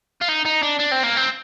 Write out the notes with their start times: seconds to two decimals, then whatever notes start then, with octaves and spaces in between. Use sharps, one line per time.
0.21 F4
0.29 D#4
0.46 D#4
0.63 D4
0.79 D4
0.92 C4
1.04 A#3
1.17 C4